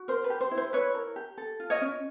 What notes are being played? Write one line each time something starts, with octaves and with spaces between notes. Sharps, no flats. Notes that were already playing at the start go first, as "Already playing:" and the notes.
Already playing: F#4
A#4 C5
B4
G4
C5
E4
C5
E4 B4 C#5
A#4
G4
A4
F4
C#5 D#5
C#4